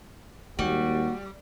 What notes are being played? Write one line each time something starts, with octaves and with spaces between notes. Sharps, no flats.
D#2 G3 G#3 A#3 F#4